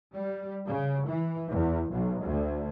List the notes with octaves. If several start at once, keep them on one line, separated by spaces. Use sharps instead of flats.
G3
C#3
E3
E2
B1
D2